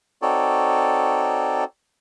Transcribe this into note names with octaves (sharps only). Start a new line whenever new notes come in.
C4 D#4 F#4 A4 C#5 D5